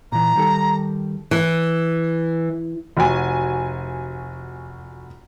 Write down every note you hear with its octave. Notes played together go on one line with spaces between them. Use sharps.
A#2 E3 A#5
D#3 G3 A4
E3
F1 F#4 G#5